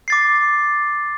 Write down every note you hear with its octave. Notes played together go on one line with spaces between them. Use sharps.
D6 A6 C7